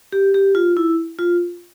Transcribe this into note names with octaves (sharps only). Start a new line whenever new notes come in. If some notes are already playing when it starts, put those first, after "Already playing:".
G4
G4
F4
E4
F4